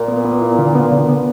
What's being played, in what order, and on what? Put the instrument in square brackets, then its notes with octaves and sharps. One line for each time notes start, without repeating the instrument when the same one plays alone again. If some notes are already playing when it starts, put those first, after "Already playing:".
Already playing: [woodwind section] A#2
[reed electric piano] B3
B3
E4
D3
B3
D3
B3